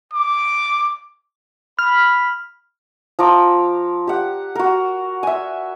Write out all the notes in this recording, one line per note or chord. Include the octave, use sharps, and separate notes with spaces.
D6
B5 F6
F3 A#5 D6 E6
G4 F#5
F#4 A#4
E5 G#5